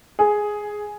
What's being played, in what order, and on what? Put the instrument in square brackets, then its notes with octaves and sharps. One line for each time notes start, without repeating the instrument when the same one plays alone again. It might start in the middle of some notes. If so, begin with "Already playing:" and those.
[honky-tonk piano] G#4